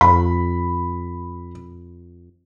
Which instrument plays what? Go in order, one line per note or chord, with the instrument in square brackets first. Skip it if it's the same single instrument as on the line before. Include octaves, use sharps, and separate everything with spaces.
[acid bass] F2 [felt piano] B5